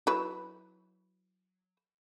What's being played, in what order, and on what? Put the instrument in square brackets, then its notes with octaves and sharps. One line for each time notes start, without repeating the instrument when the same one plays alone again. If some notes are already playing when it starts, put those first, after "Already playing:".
[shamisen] F#3 E4 B4